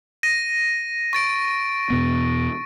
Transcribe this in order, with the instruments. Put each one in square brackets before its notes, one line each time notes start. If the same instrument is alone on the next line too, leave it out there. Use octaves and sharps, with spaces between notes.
[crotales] A#6 D#7
C#6 A6 D7
[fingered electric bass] E2 B2 B3